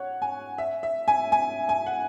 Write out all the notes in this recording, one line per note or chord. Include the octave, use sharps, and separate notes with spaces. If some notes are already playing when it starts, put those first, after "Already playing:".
Already playing: C#5 F#5
G#5
E5
E5
G#5
G#5
G#5
F#5